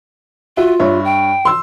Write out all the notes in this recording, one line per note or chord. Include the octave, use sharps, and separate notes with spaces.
F4 F#4 E5
G2 C#5 E5
G5
C6 E6